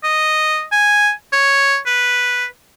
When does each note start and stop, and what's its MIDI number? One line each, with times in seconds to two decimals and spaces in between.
0.03 0.63 75
0.72 1.10 80
1.33 1.78 73
1.86 2.45 71